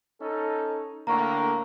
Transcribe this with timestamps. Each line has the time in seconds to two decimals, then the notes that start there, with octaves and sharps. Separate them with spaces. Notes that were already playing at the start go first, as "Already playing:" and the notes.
0.22 C#4 D#4 A4
1.07 A2 D3 A#3 A#5 C#6